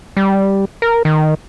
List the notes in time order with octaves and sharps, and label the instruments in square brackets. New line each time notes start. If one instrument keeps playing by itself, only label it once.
[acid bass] G3
A#4
D#3